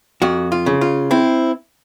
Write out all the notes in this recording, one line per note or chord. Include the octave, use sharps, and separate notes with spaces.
F2 F#4
F4
C#3
F4
C4 E4